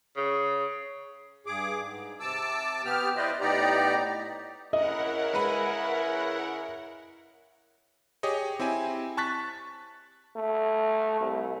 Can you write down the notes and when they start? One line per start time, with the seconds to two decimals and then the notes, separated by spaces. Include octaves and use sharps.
0.16 C#3
1.46 G2 G#4 D6
1.81 G#2
2.20 C3 A5 D6 E6
2.85 B3 G4 F6
3.16 E4 B4 C5 D5 D#5
3.41 A2 B3 D#4 G4 D5 A#5
4.73 C#3 E4 A#4 D#5 F#5
5.33 G#3 B4 B5
8.23 G4 G#4 C#5 D#5
8.59 C4 E4 G4 G#5
9.17 A5 C#6 F#6 A6 B6
10.36 A3
11.20 C2